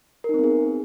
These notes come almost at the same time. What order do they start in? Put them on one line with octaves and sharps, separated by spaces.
A#4 D#4 C4 B3 G#4